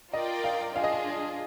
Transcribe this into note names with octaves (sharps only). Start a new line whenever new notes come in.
F4 A#4 D5 D#5 G5
F5
D4 F4 G#4 F5
D#5
F5